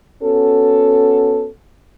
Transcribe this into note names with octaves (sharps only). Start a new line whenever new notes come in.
B3 C#4 F#4 A4